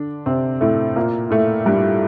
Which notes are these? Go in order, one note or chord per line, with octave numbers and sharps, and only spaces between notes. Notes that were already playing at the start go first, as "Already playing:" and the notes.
Already playing: D3 D4
C3 C4
A2 A3
A#2 A#3
A2 A3
G2 G3